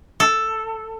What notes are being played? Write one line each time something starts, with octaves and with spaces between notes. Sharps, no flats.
A4